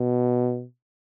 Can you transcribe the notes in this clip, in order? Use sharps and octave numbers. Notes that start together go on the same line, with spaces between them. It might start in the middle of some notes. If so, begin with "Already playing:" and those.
Already playing: B2